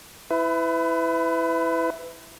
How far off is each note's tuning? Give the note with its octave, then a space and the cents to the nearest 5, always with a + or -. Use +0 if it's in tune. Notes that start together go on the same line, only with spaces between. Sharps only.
E4 +0 B4 +30